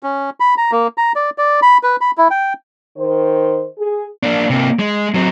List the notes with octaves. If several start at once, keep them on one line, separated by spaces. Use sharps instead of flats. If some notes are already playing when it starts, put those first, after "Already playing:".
C#4
B5
A#5
A#3
A#5
D5
D5
B5
B4
B5
E4
G5
D#3 C5
G#4
A#3 D4
C3 A#3
G#3
F#3 C4